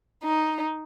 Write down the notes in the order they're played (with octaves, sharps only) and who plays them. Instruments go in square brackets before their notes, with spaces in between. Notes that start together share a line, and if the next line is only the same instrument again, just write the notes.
[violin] D#4